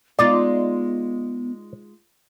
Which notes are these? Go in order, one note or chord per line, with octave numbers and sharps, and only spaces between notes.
G#3 B3 D#4 F4 D5